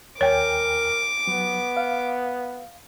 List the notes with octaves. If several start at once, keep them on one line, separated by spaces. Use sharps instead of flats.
D#2 A#4 C#5 G5 G#5 D6
F#3 B3
F5